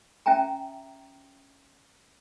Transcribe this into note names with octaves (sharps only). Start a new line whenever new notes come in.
C#4 E5 G5 G#5 A#5